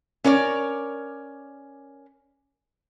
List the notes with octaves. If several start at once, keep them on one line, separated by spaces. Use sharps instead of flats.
C#4 A#4 C#5 D5